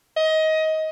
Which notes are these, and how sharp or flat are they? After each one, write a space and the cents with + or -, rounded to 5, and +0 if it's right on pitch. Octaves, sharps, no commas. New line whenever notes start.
D#5 +20